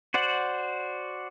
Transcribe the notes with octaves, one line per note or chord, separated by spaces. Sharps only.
F#4 C5 D5 F#5